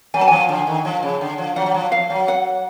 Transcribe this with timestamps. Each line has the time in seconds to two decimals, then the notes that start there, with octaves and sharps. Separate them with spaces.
0.14 F#3 G#5
0.21 A5
0.28 F3 G#5
0.49 D3
0.67 D#3
0.85 F3
1.03 C#3
1.21 D3
1.38 F3
1.56 F#3 F#5
1.66 F#3
1.74 F3
1.92 F5
2.10 F#3
2.28 F#5